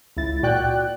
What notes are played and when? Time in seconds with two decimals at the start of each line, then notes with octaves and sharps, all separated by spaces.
0.17 C#2 E4 A6
0.43 A#2 F#4 D5 G5 F#6